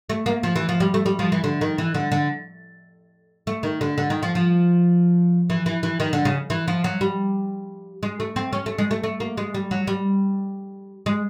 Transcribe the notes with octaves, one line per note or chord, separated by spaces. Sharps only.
A3
A#3
F3
E3
F3
G3
A3
G3
F3
E3
D3
D#3
E3
D3
D3
A3
D#3
D3
D3
D#3
F3
F3
E3
E3
E3
D#3
D3
C#3
E3
F3
F#3
G3
G#3
A3
C4
C#4
A3
G#3
A3
A3
A#3
G#3
G3
F#3
G3
G#3